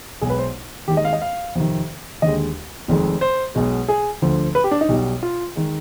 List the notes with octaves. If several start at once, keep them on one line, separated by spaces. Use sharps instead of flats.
B1 B2 G#3 G#4
B4
C5
D#2 D#3 G#3 G4
D#5
F5
D#5
F5
F2 C3 D#3
D#2 D3 G#3 D#5
F1 F2 D#3 G#3
C5
B1 B2 G#3
G#4
D2 D3 F3
B4
G4
D4
D#4
B1 B2 G3
F4
D#3 G#3